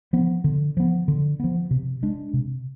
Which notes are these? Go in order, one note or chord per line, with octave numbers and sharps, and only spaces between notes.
F3 B3
D3
F3 B3
D3
F3 B3
C3
G#3 D4
C3